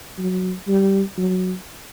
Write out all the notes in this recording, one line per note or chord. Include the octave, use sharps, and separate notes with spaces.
F#3
G3
F#3